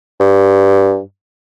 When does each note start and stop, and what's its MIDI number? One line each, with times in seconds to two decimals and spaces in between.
0.20 0.99 43